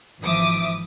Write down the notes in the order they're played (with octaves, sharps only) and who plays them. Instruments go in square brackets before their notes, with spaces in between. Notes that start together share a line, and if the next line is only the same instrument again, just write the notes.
[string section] G#1 E3 F3 E5 D6 D#6